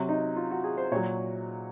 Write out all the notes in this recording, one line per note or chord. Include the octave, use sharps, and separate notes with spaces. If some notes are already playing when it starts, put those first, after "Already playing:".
Already playing: C3 F#3
D#4
F4
F#4
G#4
C5
A#2 F#3 C#5